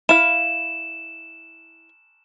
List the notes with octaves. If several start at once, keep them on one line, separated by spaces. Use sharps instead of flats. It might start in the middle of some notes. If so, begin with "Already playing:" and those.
E4 F5 E7